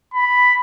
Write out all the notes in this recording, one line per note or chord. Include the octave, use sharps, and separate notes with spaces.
B5